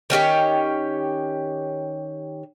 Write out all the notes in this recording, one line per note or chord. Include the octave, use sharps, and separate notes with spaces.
D#3 C#4 G4 C#5